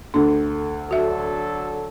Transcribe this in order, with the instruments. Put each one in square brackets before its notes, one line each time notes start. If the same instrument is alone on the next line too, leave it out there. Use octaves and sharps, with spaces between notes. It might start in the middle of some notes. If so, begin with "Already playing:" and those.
[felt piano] D2 A3 [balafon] D4
[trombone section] D3 F#3 A4 [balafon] F#4 E5